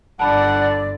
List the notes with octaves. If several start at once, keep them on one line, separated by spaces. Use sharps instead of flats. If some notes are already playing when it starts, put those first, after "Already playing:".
G1 D3 D5 F#5 A5 B5